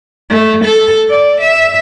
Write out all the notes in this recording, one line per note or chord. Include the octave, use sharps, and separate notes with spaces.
A3
A4
D5
E5